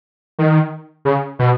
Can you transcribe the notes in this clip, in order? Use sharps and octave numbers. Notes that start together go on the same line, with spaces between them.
D#3
C#3
B2